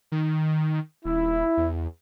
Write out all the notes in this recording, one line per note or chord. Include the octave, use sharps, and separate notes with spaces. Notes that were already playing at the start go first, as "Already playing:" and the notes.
D#3
D#1 E4
E2